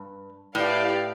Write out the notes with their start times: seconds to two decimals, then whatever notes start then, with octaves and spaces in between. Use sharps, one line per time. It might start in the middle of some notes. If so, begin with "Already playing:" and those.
Already playing: G2
0.55 A2 E4 G4 B4 D5 F5